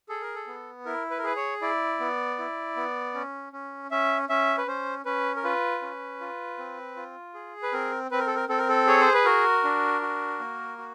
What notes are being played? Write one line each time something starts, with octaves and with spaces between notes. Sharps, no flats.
G#4 A4
A#4
A4
B3
E4 A#4
B4
A#4
G#4 B4
C#5
E4 D5
B3
E4
B3
C#4
C#4
C#4 E5
C#4 E5
B4
C#4 C5
C#4 B4
A#4
F4 B4
C#4
F4
C4
F4
G#4
B4
C4 A#4
C4 B4
A#4
A4
A#4
C4 A4
A#4
A4
G#4 C#5
C5
B4
F#4 A#4
D4
F#4
A#3
F#4